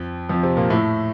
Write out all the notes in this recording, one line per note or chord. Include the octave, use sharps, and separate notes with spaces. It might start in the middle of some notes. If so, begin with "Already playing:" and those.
Already playing: F2 F3
F2 F3
C3 C4
A#2 A#3
A2 A3